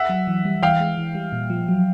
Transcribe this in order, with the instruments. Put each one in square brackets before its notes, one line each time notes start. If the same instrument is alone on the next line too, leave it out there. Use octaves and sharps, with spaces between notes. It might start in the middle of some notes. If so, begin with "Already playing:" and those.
Already playing: [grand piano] E5 F#5
[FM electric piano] F#3
E3
G3
[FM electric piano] E3 [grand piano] F5 G5
[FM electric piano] G#3
E3
G3
A#2
F3
F#3